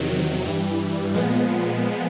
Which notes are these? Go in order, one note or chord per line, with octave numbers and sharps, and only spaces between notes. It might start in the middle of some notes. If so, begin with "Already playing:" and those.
Already playing: E2 C3 D#3 F#3
G2 E3 G3
A#2 F3 G#3 B3